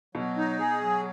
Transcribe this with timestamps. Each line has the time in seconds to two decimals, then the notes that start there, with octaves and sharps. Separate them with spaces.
0.15 B2 F#3
0.37 D#4
0.59 G#4
0.81 F#3